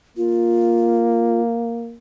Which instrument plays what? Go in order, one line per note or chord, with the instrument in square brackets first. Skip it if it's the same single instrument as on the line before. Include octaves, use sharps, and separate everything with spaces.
[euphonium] A#3 [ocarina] F4